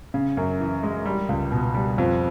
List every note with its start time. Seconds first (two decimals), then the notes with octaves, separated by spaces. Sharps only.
0.14 C#3
0.37 F#2
0.60 E3
0.83 G#3
1.05 G3
1.29 C#2
1.52 B2
1.74 G3
1.98 F2